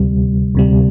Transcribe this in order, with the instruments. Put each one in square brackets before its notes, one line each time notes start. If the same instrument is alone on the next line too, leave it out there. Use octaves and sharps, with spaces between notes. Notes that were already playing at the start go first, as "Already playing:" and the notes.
Already playing: [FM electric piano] D2 C3 G3
D2 C3 G3